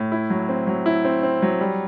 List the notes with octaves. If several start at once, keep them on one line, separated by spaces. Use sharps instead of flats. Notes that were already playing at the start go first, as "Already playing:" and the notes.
Already playing: A2
E4
F#3
C4
F#3
E4
C4
C4
F#3
G3